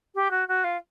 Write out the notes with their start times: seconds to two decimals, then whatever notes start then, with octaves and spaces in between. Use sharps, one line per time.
0.15 G4
0.31 F#4
0.48 F#4
0.64 F4